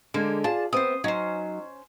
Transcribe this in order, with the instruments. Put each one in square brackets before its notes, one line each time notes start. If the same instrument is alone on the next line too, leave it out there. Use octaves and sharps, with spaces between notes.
[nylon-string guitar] D3 G#3 [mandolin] A#3
[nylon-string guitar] F4 G#4 D5 [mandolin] A5
[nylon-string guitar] B3 C4 E5 [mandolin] C5 D#6
[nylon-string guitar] F#3 D#4 [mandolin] C#4 C5